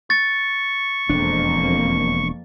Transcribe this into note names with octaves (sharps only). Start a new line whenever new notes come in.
C#6 A6
E1 F2 A#3 D4